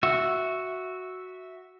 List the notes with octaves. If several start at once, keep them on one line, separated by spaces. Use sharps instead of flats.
F#4 E5